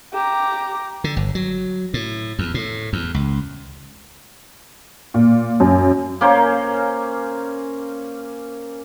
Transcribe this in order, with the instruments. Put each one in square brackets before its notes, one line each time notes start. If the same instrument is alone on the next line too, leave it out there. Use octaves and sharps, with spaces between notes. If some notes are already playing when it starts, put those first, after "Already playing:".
[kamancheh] G4 A#5
[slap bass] D3
G1
F#3
A2
E2
A2
E2
C#2
[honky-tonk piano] A#2
F#2
[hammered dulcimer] A#3 C#4 A#4 C5